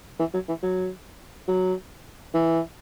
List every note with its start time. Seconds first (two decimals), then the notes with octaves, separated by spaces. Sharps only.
0.19 E3
0.34 F#3
0.48 E3
0.63 F#3
1.48 F#3
2.34 E3